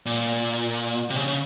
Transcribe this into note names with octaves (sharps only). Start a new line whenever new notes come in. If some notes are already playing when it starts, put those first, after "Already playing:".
A#2
C3
C#3
C#3